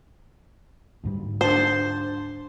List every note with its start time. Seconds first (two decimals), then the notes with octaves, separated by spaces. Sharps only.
1.04 D2 G#2 G3
1.41 D4 C5 A5 C6